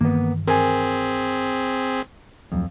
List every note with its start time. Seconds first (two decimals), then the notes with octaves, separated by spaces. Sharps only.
0.01 G2 D#3 E3 A#3 B3
0.48 C4 G#4 A#4 G#5 B6
2.52 D1 F2 F#3